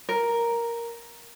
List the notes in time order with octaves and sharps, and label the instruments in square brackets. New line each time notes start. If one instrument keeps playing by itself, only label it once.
[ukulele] A#4